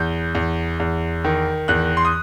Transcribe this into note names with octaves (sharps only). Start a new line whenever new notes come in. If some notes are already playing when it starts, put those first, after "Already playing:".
Already playing: E2 G6
E2
E2
D#3
E2 F#6
C6
D#6